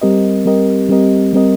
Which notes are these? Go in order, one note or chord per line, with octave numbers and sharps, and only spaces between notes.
G3 C4 G4 A#4 D#5
G3 C4 G4 A#4 D#5
G3 C4 G4 A#4 D#5
G3 C4 G4 A#4 D#5